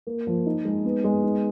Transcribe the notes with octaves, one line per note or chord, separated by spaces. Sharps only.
A#3
F3
D#4
G#3
B3
G#3
D#4